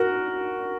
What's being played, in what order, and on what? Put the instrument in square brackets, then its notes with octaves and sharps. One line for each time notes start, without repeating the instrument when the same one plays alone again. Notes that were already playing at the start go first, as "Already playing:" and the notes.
Already playing: [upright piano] F#4 A#4